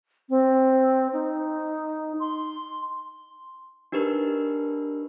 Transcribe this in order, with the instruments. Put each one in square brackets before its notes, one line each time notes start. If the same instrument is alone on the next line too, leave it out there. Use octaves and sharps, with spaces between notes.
[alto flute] C4
D#4
C6
[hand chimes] D4 D#4 G4 A#4 B4